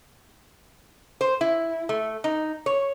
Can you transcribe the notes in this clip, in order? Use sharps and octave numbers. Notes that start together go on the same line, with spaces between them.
C5
E4
A3
D#4
C#5